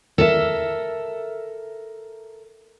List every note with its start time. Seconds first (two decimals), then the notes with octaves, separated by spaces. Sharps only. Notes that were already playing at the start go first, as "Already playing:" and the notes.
0.18 A4 A#4 E5